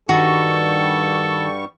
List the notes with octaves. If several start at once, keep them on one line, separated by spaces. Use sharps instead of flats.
G2 D#3 G3 F#4 A4 C#6